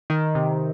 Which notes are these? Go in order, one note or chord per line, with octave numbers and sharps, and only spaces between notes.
D#3
C3